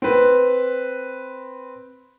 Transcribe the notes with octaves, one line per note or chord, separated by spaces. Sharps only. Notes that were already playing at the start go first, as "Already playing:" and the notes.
C4 B4